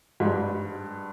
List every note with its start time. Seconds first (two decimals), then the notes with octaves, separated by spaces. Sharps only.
0.20 G#2
0.25 G2